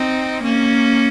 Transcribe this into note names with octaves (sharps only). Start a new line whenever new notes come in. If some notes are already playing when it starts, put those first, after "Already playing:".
Already playing: C4 D#4
A#3 C#4